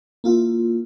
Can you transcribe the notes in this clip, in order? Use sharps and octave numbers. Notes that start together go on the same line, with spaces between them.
A#3 E4 F4